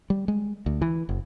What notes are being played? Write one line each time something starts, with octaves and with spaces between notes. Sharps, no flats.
G3
G#3
D2
E3
F#1